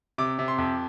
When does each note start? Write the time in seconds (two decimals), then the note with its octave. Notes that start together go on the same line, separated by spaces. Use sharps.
0.18 C3 D6
0.39 C3
0.48 C6
0.58 F2